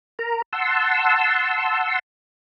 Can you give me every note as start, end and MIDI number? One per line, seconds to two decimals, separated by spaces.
0.19 0.42 70
0.19 0.42 82
0.53 1.99 78
0.53 1.99 81
0.53 1.99 84
0.53 1.99 88